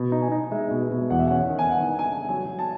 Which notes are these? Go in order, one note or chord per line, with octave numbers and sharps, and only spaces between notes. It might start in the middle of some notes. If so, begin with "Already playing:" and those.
Already playing: B2
D#4
G#5
D#4
G#3 E5
B2
B2
E2 F#5
E5
C#4 F#5
D#3
G#5
B3 F#5
D#4
G#5
C#3
F#3 G#5
F#3
A5